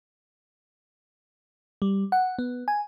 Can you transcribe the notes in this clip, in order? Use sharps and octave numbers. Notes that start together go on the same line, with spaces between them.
G3
F#5
B3
G#5